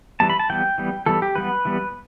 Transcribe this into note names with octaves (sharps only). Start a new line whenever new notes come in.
E3 G3 B3 A5
B5
A5
E3 G3 B3 G5
E3 G3 B3
E3 G3 B3 A4
G4
E3 G3 B3 B4
E3 G3 B3